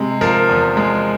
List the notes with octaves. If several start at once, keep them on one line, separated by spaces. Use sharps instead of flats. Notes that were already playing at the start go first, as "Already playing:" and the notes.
Already playing: C3 G#3
F3 A#4
E2
G#3